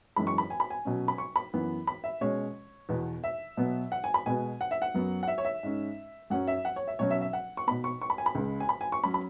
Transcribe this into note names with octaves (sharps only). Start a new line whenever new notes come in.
F#2 E3 G#3 B5
C#6
B5
G#5
B5
G#5
B2 F#3 C#4
B5
C#6
B5
F#2 E3 B3
B5
E5
B2 G#3 C#4 C#5
E2 B2 B3
E5
B2 F#3 B3
F#5
G#5
B5
B2 G#3 B3 G#5
F#5
E5
F#5
F#2 F#3 B3
F#5
E5
C#5
E5
G#2 G#3 C#4
F#2 F#3 C#4 F#5
E5
F#5
C#5
E5
B2 F#3 C#4 C#5
E5
E5
F#5
C#6
B2 B3 B5
C#6
C#6
B5
G#5
B5
C#2 C#3 G#3
G#5
B5
G#5
C#6
F#3 C#4 B5
B5